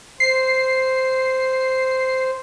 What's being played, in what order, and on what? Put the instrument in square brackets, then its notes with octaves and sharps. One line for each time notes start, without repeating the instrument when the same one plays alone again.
[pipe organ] C5 [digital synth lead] C7